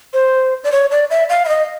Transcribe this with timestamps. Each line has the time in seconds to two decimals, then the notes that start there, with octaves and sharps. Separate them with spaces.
0.13 C5
0.64 D5
0.72 C#5
0.91 D5
1.10 E5
1.29 F5
1.45 E5
1.48 D#5